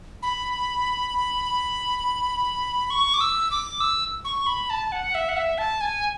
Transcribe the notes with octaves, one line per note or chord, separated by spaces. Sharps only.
B5
C#6
D6
E6
D6
E6
C#6
B5
A5
F#5
E5
F#5
E5
A5
G#5